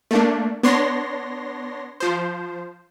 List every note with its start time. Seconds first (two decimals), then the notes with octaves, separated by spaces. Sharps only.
0.11 A3 A#3 D4
0.63 B3 D4 C#5 C6 A#6
2.00 F3 C5